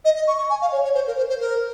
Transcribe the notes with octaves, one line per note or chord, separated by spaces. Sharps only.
D#5
D#5
C#6
C#6
G#5
F5
C#5
C#5
C5
A#4
C5
C5
A#4